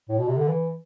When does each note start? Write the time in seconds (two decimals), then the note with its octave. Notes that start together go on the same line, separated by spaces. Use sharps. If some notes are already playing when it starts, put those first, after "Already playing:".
0.09 A2
0.18 B2
0.28 C3
0.37 D3
0.48 E3